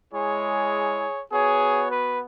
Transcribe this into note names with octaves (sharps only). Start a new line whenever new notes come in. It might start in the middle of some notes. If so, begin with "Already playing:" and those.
G#3 E4 G#4 C#5
B3 F#4 G#4 C#5
B4